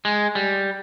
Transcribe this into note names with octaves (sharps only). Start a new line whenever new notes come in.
G#3
G3